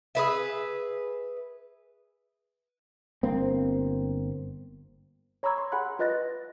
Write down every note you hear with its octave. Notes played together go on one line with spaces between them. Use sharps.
G#4 B4 E5
G1 A#3 C4
C#5 A#5 B5 C#6 E6 G#6
C6
G#4 F#5 G#5 B5 F#6
F4 B4 D#5 F#6 A6 A#6